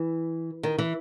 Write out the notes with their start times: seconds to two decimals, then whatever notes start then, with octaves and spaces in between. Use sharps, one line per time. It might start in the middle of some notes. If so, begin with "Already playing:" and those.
Already playing: E3
0.63 D#3
0.79 E3